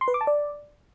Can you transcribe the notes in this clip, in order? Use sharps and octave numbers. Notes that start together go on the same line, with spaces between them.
C6
B4
D6
A5
D5